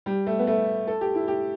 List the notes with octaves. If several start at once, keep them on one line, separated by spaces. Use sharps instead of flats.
G3
A3
B3
A3
A4
G4
E4
G4